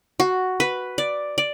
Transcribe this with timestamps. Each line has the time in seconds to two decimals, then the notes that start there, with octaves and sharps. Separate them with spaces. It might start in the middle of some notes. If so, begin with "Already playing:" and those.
0.20 F#4
0.60 B4
0.98 D5
1.38 D5